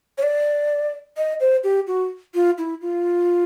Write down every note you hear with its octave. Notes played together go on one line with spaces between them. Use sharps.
C#5
D5
D#5
C5
G4
F#4
F4
E4
F4